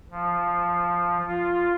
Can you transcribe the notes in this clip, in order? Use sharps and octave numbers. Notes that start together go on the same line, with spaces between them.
F3
F4